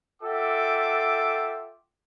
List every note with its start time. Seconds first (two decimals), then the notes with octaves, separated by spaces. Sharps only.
0.23 F4 A4 E5 F#5 G5 D6